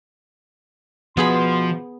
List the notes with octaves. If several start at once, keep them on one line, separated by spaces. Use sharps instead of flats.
B2 F3 B3 G#4 B5 C6